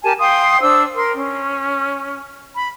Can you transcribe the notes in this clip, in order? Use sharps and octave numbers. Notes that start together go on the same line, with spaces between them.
G4 A#4 G#5 A5
F5 G5 C6 D#6
D4 C5 E6
A#4 C6
C#4
B5